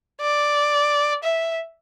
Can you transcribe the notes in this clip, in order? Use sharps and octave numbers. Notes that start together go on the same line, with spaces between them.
D5
E5